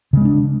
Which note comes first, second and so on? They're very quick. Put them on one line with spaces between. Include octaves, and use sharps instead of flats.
C#3 G#3 C4 D4